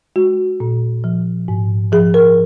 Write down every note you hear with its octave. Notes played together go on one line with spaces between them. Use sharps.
G#3 F#4
A#2
F3
G#2
F3 G#4
A#4